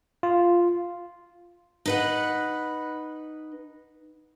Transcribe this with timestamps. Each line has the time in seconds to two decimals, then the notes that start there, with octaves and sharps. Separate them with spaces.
0.23 F4
1.86 D#4 B4 F#5